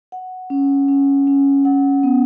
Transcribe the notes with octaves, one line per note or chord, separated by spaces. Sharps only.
F#5
C#4
C#4
C#4
F#5
B3